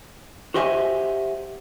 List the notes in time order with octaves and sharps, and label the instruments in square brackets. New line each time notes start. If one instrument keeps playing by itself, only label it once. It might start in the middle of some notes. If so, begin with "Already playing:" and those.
[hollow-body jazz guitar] F#4 G4 C5 D#5 E5 G#5